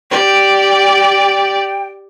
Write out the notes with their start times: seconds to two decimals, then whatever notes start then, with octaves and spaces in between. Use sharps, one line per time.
0.11 G4 D5 G5